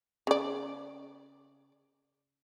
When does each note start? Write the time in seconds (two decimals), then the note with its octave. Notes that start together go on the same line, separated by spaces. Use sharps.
0.27 C#3 D5